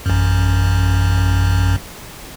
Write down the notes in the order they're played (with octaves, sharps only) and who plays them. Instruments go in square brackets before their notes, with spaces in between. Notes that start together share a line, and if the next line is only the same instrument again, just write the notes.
[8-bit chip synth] A1 F#2